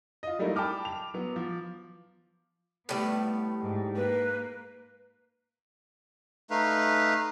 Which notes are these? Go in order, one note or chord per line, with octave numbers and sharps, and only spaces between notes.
F4 D#5
F#3 G3 A3 A#3 D#4 E4
G5 A5 B5 D6 F6
F7
F#3 B3
F3
A2 F#3 G3 A3 B3
G#2
A#3 B4
A3 D#4 B4 F5